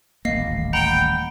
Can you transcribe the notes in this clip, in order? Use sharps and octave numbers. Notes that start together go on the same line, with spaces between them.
D#1 A1 A#3 D#5 F5 C7
F#5 G5 A#5 B5